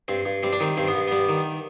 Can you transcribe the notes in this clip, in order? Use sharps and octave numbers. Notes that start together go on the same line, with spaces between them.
G2 C4
G2
G3 C4
D4
D#3 C4
G2 C4
B3
G2
G3 B3
D#3